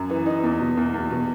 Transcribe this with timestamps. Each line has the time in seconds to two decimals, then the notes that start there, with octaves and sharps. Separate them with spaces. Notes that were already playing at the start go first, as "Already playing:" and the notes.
Already playing: F#2
0.10 E3
0.26 D#4
0.43 E2
0.60 B2
0.77 E2
0.94 E2
1.11 B2